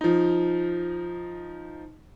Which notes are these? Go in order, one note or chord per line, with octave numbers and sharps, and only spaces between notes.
F3 D#4